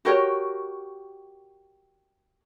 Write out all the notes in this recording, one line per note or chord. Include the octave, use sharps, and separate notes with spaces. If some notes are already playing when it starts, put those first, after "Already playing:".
F#4 G4 A#4 C#5